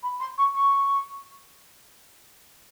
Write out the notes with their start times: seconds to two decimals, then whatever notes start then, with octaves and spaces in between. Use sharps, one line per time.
0.03 B5
0.20 C6
0.38 C#6
0.54 C#6